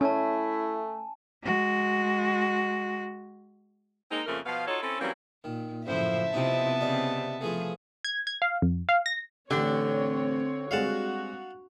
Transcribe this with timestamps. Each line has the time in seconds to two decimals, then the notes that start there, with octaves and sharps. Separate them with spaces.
0.01 A3 C#4 E4 G#5 A5
1.43 G#3 F#4
4.10 G#3 A#3 C4 D#4
4.26 F2 C#3 F3 A3 A#3 A#4
4.45 B2 F3 B3 F5
4.66 D#4 F4 F#4 A4 C#5
4.81 C4 C#4 E4 A4
5.00 E3 F#3 G3 A#3 C4 C#4
5.44 A#2 D#3
5.87 F#2 A2 C#3 F3 E4 C5 E5
6.33 C3 F3 B3 C4 D#4 E4 A5
6.81 C#3 G3 C4 D#5
7.41 E3 F3 A3 G#4
8.05 G#6
8.27 G#6
8.42 F5
8.62 F2
8.89 F5
9.06 A#6
9.51 A1 D3 C4 D4 G4 C#5
10.71 G3 G#3 C4 F#4 F5 F#5 A5